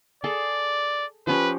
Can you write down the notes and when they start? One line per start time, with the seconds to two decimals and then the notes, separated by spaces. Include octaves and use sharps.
0.24 G#4 A4 D5
1.27 F3 C#4 G4 B4